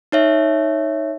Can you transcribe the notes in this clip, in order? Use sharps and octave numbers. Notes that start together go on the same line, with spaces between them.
D#4 C#5 E5